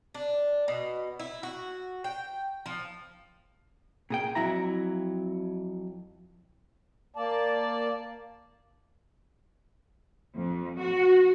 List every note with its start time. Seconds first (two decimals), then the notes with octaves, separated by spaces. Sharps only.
0.14 D4
0.68 B2
1.19 E4
1.43 F#4
2.04 G5
2.66 F3
4.10 A#2 G#4 G5
4.35 F2 F#3 E4 E5 A#5
7.16 A#3 D5 A5
10.35 F2
10.79 F#4